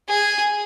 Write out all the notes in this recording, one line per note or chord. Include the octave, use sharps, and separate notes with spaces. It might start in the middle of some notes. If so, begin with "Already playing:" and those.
G#4